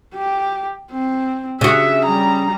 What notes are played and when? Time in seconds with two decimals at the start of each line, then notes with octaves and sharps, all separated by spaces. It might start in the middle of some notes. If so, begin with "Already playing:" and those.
0.15 G4
0.92 C4
1.61 C#3 F#4 E5
2.05 G3 A#5